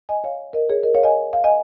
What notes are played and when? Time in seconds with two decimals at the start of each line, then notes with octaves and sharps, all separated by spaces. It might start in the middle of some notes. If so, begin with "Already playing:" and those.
0.09 D#5 G#5
0.24 C#5 F5
0.53 A#4 D#5
0.70 G#4 C#5
0.83 A#4 D#5
0.95 C#5 F5
1.03 D#5 G#5
1.33 F5
1.44 D#5 G#5